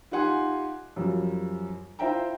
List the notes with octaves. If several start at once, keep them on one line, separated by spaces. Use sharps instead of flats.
D#4 F4 G4 F#5 G#5 C6
F#2 F3 G3
E4 F4 C5 E5 G5 A#5